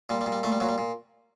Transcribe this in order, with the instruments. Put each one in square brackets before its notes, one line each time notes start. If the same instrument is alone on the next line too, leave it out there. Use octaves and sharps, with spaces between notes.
[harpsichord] A#2 G3
G3
A#2
G3
A#2 A3
G3
A#2 F#3
G3
A#2